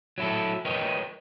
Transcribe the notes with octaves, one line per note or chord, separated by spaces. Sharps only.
F#3 E4 A4
A#4 B4 C#5 D#5 G5